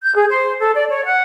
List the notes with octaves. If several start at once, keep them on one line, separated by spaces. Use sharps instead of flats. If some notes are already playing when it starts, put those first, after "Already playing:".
G6
G#4
C5
A4
D5
C#5
F#5